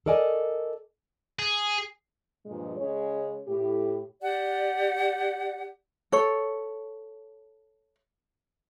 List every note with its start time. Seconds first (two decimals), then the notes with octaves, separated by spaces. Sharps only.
0.06 A4 A#4 D5 D#5 G#5
1.39 G#4
2.46 G2 A#2 F3 G#3
2.78 C#3 G#3 C#4 C#5
3.48 A2 G4
4.22 G4 D5 F#5
6.12 A4 C#5